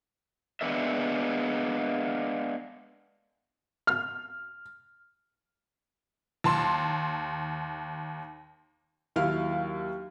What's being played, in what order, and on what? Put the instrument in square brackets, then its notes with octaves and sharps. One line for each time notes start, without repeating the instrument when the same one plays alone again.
[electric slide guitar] G#3 A#3 B3 D4 A#4 E5
[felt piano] F6
[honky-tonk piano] D#2 A5 C6
[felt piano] D#2 F#3 E4 F5 F6